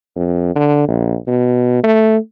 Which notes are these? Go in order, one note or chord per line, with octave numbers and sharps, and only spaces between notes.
F2
D3
A#1
B2
A3